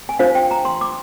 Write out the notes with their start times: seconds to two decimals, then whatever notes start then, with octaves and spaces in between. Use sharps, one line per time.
0.09 G#5
0.19 D4 F4 C5 F5
0.35 G5
0.51 A#5
0.65 C6
0.81 D6